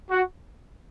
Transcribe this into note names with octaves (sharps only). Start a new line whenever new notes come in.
F#4